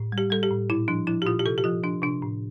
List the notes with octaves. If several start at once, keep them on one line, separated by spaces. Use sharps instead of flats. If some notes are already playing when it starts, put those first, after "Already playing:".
Already playing: A2
G3
G4
G3 A4
G4
A2
A#2 E4
F3 D4
F3 E4
G4
A#2 F4
G4
C3 A4
G4
F3 F4
F3 D4
C3 D4
A2